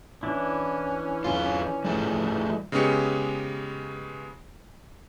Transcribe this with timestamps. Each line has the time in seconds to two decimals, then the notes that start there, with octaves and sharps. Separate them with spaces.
0.23 E3 C#4 D4 E4
1.24 E2 G#2 F4
1.85 G3 A3 F4
2.72 C#3 G#3 B3 C#4 G4 C#7